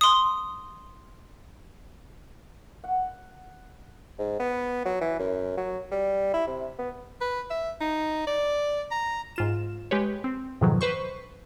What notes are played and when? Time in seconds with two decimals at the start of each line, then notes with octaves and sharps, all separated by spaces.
0.01 C6 D#6
2.84 F#5
4.19 G#2
4.40 B3
4.85 F#3
5.01 E3
5.20 F#2
5.57 F#3
5.91 G3
6.34 E4
6.47 C3
6.79 B3
7.21 B4
7.50 E5
7.81 D#4
8.27 D5
8.91 A#5
9.36 G#2 F4 E7
9.91 G#3 G4 B4 C#5
10.24 C4
10.61 F2 G#2 B2 D#3 F3 F#3
10.81 B4 C5 C#6